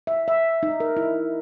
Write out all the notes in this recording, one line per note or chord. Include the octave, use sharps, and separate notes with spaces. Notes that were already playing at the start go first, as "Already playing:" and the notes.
E5
E5
D#4
A#4
E4